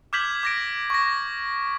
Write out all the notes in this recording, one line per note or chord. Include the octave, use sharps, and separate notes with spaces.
D6 F6 G6 G#6 B6 F#7
D6 A#6 D7
C#6 A#6